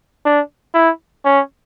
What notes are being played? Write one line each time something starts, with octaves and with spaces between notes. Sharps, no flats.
D4
E4
C#4